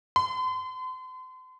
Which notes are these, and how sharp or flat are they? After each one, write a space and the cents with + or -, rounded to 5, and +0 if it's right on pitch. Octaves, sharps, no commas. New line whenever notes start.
C6 -40